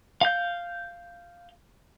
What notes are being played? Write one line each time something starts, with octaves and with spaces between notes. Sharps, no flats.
F5 G6